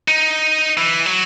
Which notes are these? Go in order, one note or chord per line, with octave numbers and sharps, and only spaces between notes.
D#4
E3
F#3